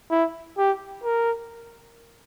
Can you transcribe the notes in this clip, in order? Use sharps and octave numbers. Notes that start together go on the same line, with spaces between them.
E4
G4
A#4